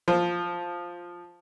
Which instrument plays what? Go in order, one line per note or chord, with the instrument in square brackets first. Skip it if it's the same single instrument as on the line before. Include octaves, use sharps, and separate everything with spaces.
[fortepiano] F3